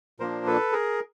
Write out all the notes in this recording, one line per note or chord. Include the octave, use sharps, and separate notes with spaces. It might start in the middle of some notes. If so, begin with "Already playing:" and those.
A#2 F3 A#3 D4 A#4 C5
A4 B4
G#4 A#4